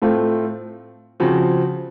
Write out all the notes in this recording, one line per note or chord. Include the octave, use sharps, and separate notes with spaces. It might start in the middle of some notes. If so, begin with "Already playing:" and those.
A2 A3 C4 F4
C#3 F3 C4 F#4